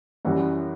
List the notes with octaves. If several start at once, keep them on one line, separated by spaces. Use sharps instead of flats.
F#2 E3 G3 F#4